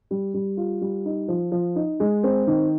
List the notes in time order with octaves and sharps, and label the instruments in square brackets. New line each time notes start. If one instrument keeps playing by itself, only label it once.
[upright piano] G3
G3
F4
G3
D#4
F3
F3
D#4
G#3
C4
D#3